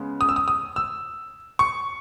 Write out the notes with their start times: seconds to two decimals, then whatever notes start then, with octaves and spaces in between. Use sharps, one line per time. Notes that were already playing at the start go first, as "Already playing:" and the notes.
Already playing: C#3 G#3 B3
0.21 D#6
0.29 E6
0.36 D#6
0.48 D#6
0.76 E6
1.59 C#6